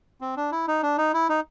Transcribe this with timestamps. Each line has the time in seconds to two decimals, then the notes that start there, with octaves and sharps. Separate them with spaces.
0.21 C4
0.37 D4
0.52 E4
0.68 D#4
0.83 D4
0.98 D#4
1.14 E4
1.29 D#4